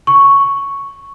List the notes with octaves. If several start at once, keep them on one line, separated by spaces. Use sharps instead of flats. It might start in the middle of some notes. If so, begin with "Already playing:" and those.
C#6